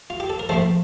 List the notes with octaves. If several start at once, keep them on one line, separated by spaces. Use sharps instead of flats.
F4
G4
A4
A#4
A#1 A2 F3 A3 C4 A4 C5